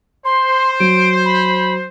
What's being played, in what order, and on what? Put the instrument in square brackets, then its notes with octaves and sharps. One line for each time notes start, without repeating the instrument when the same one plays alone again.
[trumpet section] C5 [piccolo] C6
[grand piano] F#3 [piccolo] D7
[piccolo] B5